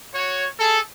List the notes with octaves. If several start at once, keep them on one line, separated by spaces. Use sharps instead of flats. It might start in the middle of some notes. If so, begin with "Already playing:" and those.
F#4 C#5
G#4 A4